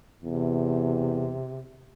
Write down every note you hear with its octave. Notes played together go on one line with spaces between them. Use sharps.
E2 C3